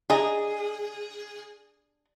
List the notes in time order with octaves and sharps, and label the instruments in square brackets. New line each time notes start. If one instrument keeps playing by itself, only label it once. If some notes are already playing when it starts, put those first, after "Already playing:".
[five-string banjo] D4 D#5 A#5 [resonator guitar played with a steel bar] G#4